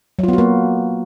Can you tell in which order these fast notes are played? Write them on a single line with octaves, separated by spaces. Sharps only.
F#3 F4 B3 F#4 A#3